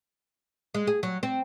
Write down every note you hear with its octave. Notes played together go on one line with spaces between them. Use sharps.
G#3
G#4
F#3
C4